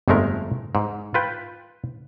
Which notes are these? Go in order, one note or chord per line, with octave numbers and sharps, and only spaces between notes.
G1 F2 G#3 A3 A#4
G#2
F4 B4 G5